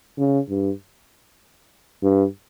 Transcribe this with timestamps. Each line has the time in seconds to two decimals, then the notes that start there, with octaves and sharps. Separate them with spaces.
0.18 C#3
0.49 G2
2.03 G2